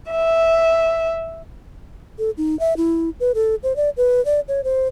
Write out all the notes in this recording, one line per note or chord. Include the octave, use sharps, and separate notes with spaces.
E5
A4
D#4
E5
E4
B4
A4
C5
D5
B4
D5
C#5
C5